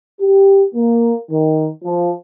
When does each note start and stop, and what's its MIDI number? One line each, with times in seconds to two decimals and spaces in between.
0.22 0.64 67
0.75 1.15 58
1.31 1.69 51
1.84 2.10 53